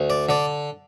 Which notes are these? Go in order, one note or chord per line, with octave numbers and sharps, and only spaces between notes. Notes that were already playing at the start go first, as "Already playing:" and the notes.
Already playing: D2
D5
D3 D5